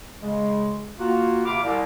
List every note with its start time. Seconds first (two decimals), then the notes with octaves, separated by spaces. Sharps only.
0.20 C#3 G#3
0.98 A#3 F4 F#4
1.45 C3 F5 B5 D6
1.63 C2